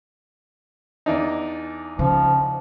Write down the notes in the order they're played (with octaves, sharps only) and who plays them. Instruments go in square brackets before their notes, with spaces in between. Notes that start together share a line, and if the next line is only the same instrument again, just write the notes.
[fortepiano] E2 D4 D#4
[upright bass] C#3 [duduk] F3